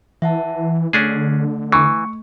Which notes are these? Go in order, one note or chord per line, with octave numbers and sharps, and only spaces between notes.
E3 E5 F#5 A5
D3 A3 C#4 D4 G#4
E3 C#6